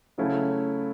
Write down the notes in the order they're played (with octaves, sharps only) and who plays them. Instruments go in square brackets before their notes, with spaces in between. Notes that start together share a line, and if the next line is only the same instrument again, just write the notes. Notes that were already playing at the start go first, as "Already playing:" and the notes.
[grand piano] C#3 F#3 A3 C#4 E4